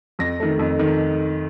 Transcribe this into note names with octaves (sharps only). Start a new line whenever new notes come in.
F2 A#6
D#3 A3
F2
D#3